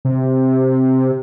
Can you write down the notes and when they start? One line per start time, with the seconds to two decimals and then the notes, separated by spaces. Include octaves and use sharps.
0.05 C3